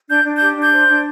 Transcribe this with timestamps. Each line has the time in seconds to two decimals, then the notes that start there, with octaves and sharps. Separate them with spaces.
0.08 D4 G6
0.23 D4
0.36 G4 G6
0.56 D4
0.62 G6
0.72 C5
0.88 D4